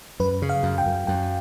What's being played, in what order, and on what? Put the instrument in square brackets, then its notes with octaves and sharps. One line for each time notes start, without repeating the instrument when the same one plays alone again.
[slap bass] F#2 [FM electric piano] B4
[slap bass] C#3
[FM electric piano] F5
[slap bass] F#2
[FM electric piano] G5
[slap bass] F#2
[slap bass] F#2 [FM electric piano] G5